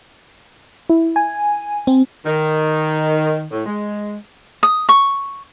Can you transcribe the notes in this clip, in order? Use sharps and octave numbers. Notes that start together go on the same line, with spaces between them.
E4
G#5
C4
D#3
A2
G#3
D#6
C#6